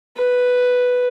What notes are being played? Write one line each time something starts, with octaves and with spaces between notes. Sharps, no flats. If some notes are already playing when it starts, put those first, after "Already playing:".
B4